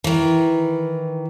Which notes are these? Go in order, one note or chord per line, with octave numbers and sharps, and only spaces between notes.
D#3 E3